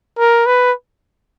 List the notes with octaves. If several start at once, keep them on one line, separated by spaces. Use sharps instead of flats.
A#4
B4